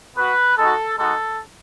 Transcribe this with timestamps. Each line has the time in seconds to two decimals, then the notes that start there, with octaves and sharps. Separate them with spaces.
0.15 B3 F#4 B4
0.56 G#3 D#4 F#4 A4
0.98 G#3 D#4 F#4 A4